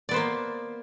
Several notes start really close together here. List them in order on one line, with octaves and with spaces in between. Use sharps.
D5 B3 C5 A#3